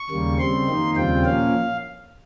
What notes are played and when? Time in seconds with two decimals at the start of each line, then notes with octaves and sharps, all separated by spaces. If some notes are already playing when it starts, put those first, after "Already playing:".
Already playing: C#6
0.10 D#2 C#3 G3 A#3
0.39 C#3 G3 C4 C6
0.68 F2 D#3 A#3 D#4
0.96 D#2 C#3 G3 C4 F4 G5
1.25 A#2 F3 A#3 C#4 F5